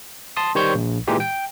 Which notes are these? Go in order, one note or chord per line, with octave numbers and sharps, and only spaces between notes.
A5 C6 D#6
D#3 G3 C5 C#5 C#6 G6
A#1
A#2 E3 G#3 D#4 G4
G5